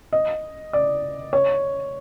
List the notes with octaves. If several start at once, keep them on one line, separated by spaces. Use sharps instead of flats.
D#5
D5
C#5